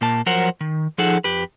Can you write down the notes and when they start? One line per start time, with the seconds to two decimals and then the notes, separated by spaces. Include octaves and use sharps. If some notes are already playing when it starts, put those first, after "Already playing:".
0.01 A#2 A#3 A5
0.26 F3 F#3 A#4 C5 F#5
0.61 D#3
0.98 F3 D#4 G#4 A4 F#5
1.24 F2 G4 B4